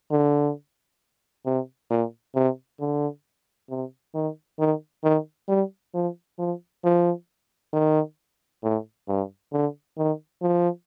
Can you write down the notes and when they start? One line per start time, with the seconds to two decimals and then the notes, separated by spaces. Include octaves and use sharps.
0.11 D3
1.45 C3
1.90 A#2
2.35 C3
2.80 D3
3.70 C3
4.14 D#3
4.59 D#3
5.04 D#3
5.48 G3
5.94 F3
6.39 F3
6.84 F3
7.73 D#3
8.63 A2
9.08 G2
9.53 D3
9.97 D#3
10.42 F3